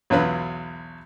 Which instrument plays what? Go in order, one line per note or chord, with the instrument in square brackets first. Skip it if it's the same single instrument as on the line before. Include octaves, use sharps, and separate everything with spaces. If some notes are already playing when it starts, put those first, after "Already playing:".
[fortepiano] B1 E2 F#3 F4 B4